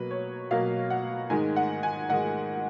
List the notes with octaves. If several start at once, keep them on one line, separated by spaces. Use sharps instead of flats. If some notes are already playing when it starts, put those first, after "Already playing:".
Already playing: B2 F#3 A#3 B4
C#5
B2 F#3 A#3 F5
F#5
G#2 D#3 G#3 G#5
F#5
G#5
G#2 D#3 G#3 F#5